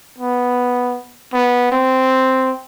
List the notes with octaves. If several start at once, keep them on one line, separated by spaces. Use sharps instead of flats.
B3
B3
C4